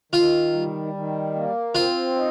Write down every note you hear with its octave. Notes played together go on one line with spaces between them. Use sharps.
D#3 F4
G3
D#3
A#3
C4 F4
D#4